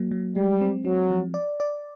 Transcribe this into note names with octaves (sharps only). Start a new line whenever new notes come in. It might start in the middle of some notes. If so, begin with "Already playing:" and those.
Already playing: F#3 A#3
F#3
G3 G#3
C4
F#3 C4
F3
D5
D5